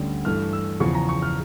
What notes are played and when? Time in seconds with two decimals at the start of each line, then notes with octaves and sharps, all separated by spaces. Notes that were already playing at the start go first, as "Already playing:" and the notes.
Already playing: D2 D3 G3 C#4
0.25 G2 E3 A3 F6
0.53 E6
0.80 E2 C#3 F3 C#6
0.95 A#5
1.09 C#6
1.22 F6